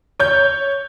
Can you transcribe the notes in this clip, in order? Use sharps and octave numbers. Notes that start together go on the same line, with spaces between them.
C#5 G6